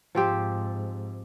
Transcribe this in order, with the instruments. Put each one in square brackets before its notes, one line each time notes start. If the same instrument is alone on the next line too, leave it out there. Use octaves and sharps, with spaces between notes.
[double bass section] G#2 [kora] F3 C4 G4